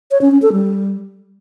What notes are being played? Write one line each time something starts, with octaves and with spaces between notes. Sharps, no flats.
C#5
C#4
C#4
A4
G3